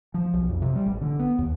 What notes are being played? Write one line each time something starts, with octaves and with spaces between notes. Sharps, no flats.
F3
B1
F2
C3
G3
A1
D3
B3
D#2